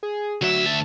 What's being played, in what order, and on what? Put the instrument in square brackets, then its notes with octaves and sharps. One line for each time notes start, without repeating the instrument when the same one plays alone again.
[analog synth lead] G#4
[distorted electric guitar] D2 E5 [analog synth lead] F#3
[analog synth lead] A5